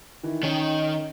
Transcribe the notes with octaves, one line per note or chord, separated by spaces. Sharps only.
D#3 E3
D#3 C#4 C#5 G5